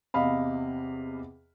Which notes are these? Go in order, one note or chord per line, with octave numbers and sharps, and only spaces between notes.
E2 C3 D#5 F5 B5